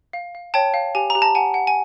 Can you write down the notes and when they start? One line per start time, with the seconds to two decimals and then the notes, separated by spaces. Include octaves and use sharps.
0.13 F5
0.35 F5
0.54 C#5 G5 A5
0.74 F5
0.95 G4 G#5
1.10 A#5
1.15 G4
1.22 A5
1.35 F#5 G#5
1.54 F#5
1.67 G#5